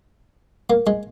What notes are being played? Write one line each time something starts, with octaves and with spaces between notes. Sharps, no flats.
A#3
G#3